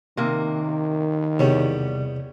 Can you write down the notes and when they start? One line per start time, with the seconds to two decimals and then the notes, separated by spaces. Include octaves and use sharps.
0.17 C3 D#3 A#3
1.39 E2 C3 G3 B3 C#5